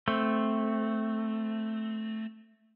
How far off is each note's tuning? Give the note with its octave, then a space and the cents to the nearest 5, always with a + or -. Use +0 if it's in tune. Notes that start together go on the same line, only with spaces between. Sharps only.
A3 +0 C4 +0